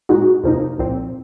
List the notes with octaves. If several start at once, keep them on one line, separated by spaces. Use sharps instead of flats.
A#2 G#3 D#4 F#4
F2 C3 F3 A#3 D#4
C2 A#2 F3 C4